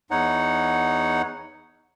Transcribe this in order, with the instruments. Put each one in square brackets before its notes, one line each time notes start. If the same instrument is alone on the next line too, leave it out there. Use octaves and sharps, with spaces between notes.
[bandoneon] E2 D#4 C#5 F#5